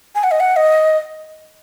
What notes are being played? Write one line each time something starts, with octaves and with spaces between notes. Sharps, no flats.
G#5
F#5
D#5
F#5
D#5